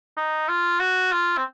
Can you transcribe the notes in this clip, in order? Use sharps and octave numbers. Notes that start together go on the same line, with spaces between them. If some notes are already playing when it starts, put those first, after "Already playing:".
D#4
F4
F#4
F4
C4